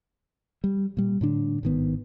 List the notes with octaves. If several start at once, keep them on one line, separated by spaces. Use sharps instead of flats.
G3
A#2 G3
A2 D3 D4
G#1 D#3 B3